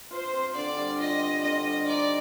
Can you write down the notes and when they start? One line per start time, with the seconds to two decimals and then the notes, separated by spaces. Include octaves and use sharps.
0.11 F4 C5
0.33 C4
0.55 D3 D5
0.77 G3
0.99 F4 D#5
1.20 C4
1.42 D3 D#5
1.64 G3
1.86 D#4 D5